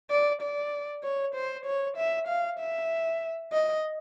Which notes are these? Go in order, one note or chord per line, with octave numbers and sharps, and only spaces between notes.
D5
D5
C#5
C5
C#5
E5
F5
E5
D#5